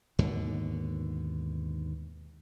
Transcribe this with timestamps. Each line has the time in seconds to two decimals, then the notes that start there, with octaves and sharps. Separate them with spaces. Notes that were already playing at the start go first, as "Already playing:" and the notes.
0.19 D#2 G#2 B2 D3